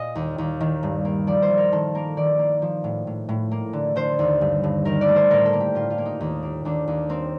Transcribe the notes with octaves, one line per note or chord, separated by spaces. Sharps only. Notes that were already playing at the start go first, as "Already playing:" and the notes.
Already playing: A#2 D#5 F5
D#2
D#2
D#3
G2
A#3
F3 D5
C5
F3
A#4
D#3 A4
A#3 A#4
D#3 D5
A#3
F3
A2
A2
A2
A#3
D3
D3 C5
D#2
G2
G2
D#3 A#4
D5
A3
C5
A2 A#4
A4
A#3
G4
A2 F4
F4
A#3
D#4
D#2
A#3
D#2 D4
D#2
A#3 C4